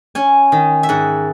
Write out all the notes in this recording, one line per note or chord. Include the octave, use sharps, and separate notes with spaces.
C#4 G#5
D#3
E5
G#2 F#5